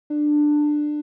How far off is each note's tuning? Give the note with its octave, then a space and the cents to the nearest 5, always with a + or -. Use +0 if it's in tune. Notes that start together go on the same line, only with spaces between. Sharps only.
D4 +15